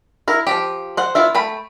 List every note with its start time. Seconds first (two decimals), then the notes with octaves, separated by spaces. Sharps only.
0.28 E4 A#4
0.47 F3 F#3 G4
0.97 C5 F#5
1.15 B3 E4 F4 E5
1.35 A3 G5 B5